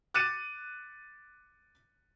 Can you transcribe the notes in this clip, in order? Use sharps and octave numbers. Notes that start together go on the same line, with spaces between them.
D6 F#6 A6 C#7 D#7 E7